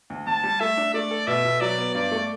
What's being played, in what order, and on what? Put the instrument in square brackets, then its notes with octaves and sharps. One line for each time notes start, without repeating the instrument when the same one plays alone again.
[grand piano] D2
[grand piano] D2 [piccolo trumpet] A5
[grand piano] G3
[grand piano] A3 [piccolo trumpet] E5
[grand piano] D4
[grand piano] A3 [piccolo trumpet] D5
[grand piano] A4
[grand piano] B2 [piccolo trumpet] E5
[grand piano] B2
[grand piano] F#3 [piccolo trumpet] D5
[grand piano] B3
[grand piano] G2 [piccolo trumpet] D5
[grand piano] A3